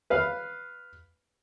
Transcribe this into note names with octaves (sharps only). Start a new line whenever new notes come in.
B4 F5